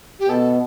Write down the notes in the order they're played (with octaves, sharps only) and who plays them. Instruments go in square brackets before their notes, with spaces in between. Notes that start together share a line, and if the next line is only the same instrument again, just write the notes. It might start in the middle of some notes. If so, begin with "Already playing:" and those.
[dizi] G4
[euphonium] B2 [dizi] A4